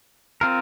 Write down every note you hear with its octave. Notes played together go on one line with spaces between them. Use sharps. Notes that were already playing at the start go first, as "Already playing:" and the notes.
C4 F4 A#4